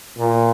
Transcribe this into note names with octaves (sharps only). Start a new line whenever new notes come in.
A#2